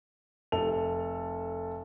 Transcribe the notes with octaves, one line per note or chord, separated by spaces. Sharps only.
F1 A4 F7